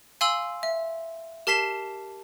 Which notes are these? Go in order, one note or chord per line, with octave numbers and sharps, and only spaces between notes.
F5 G#5 C6 E6 F#7
E5
G4 A#4 A5 B6 C7 E7